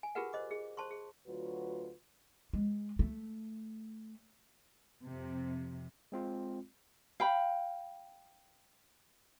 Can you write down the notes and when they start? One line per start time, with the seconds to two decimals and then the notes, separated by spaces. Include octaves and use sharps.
0.03 G#5
0.15 F4 G4 G#4 A#4 B4 F#5
0.33 C5 D#5 D6
0.51 G#4
0.77 C5 A5 C6 C#6
0.91 G#4
1.27 D2 F#3 F4 F#4 B4
2.53 G#3
2.99 A3
5.05 F2 C3
6.12 G#3 C4 F4
7.20 F5 G5 B5